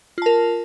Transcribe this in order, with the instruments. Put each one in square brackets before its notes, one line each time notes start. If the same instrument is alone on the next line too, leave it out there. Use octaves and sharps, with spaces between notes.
[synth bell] F4
A5
A#4